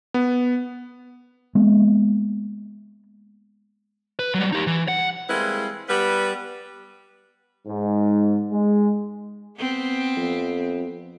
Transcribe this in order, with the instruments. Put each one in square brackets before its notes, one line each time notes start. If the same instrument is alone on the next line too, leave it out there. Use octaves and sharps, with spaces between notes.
[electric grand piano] B3
[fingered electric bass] G#3 A#3 B3
[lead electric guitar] B4
F#3 G3
D#4 G4
E3
F#5
[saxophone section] G3 G#3 A#3 C4 E4 B4
G3 B3 B4
[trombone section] G#2
G#3
[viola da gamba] B3 C4
[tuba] F2